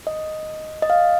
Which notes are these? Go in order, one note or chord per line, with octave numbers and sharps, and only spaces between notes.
D#5
D#5
F5